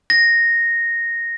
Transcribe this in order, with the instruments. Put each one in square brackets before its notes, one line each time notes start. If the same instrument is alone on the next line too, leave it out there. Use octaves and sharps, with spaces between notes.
[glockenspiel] A#6